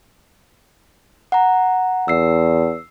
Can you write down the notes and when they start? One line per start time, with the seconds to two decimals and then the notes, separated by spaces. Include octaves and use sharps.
1.32 F#5 A#5
2.08 E2 E6 C7